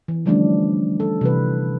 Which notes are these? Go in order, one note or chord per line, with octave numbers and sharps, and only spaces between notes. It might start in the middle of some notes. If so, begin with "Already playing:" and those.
E3
D3 F3 G3 A3 C#4 D4
A4
C3 E3 B4